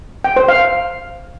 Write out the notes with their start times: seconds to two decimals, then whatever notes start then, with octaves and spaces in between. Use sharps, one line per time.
0.24 G5
0.36 C5
0.48 F5